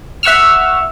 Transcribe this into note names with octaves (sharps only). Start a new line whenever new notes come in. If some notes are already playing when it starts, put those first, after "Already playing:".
E5 F#5 C#6 E6 F6